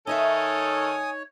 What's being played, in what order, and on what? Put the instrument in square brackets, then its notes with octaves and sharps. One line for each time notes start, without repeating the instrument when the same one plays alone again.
[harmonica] D#3 A4 [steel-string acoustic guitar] D#4 D#5 E5 [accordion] C#5 [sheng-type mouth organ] G#5 D#6